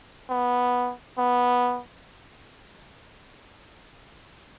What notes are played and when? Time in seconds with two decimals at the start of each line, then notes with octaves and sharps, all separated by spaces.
0.30 B3
1.18 B3